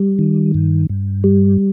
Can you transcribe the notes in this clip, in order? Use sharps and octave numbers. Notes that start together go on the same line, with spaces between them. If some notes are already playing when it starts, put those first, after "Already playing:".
Already playing: G3
D#3
G2
G2
G3